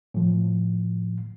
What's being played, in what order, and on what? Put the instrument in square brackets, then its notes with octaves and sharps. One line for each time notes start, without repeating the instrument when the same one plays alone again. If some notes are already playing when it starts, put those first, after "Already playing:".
[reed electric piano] A2 F3